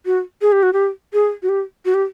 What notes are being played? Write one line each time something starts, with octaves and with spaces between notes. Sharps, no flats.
F#4
G#4
G4
F#4
G4
G#4
F#4
G4
F#4
G4